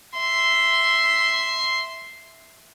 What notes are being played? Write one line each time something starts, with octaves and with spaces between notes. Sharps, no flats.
E5 C6